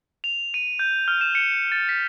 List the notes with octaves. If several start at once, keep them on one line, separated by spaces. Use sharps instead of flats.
F7
D#7
G6
F6
E7
C#7
A6
B6